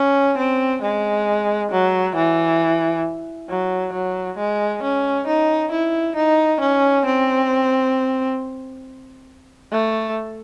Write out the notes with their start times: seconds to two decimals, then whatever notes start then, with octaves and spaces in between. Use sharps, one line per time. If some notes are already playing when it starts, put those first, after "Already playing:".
Already playing: C#4
0.37 C4
0.82 G#3
1.71 F#3
2.16 E3
3.49 F#3
3.93 F#3
4.38 G#3
4.83 C#4
5.27 D#4
5.71 E4
6.16 D#4
6.60 C#4
7.05 C4
9.72 A3